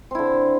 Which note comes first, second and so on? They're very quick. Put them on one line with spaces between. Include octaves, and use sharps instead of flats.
C4 E4 D3